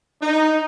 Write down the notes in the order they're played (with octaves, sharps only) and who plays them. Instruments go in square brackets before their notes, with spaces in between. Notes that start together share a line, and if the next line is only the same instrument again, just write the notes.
[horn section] D#4